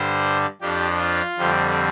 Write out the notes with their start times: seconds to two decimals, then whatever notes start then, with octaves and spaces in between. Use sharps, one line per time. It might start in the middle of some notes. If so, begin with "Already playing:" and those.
Already playing: G2 D3 G3 D4 C5
0.61 F2 F3 D4 G4
0.98 F4
1.37 F2 D3 G3 C4